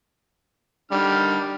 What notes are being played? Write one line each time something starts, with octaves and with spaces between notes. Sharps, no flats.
D3 D#3 G3 F6